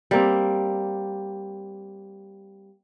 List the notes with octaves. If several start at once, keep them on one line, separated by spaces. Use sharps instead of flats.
G3 A#3 C4